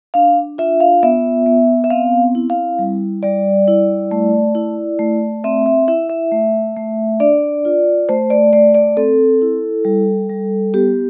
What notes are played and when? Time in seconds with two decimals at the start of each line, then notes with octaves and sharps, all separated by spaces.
0.14 D4 F5
0.58 F4 E5
0.80 F5
1.03 B3 E5
1.46 B3
1.84 E5
1.90 C4 F5
2.35 E4
2.50 F5
2.79 G3
3.23 G3 D5
3.68 E4
4.11 A3
4.55 E4
4.99 A3
5.44 C4 E5
5.66 E5
5.88 E4 E5
6.10 E5
6.32 A3
6.76 A3
7.20 D4 D5
7.65 F4
8.09 A3 C5
8.30 D5
8.53 A3 D5
8.74 D5
8.97 C4 A4
9.42 E4
9.85 G3
10.29 G3
10.74 B3 G4